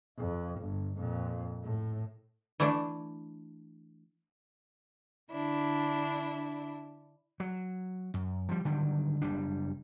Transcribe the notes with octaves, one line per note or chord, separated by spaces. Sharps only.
F2
G1
F2 A#2
A2
E3 A3 D4
D3 D4 E4
F#3
F#2
F3 G3
D3 D#3 F#3 G3
F#1 G3 D4